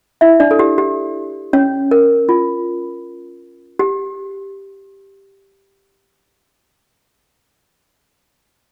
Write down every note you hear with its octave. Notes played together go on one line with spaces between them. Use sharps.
E4 E5
D4 D5
A4
G4
G4
C#4 C#5
A#4
F4
G4